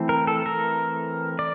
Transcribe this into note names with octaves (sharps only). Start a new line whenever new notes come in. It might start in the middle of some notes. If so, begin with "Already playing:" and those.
Already playing: E3 A3 C4
A#4
A4
A#4
D5